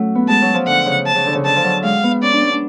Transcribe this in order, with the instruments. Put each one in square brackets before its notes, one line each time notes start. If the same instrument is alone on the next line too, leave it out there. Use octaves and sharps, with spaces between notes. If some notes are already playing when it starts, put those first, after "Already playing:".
Already playing: [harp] F#3 A3 C#4
B3
[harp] G#3 [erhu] A5
[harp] F#3
F3
[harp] D3 [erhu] F#5
[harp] C#3
[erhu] A5
[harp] C#3
D3
C#3
[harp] D3 [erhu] A5
[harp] F3
F#3
[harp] G#3 [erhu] F5
[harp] B3
[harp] C#4 [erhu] D5
[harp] D4
C#4
D4